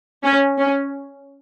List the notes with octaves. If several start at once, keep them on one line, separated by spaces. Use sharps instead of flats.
C#4
C#4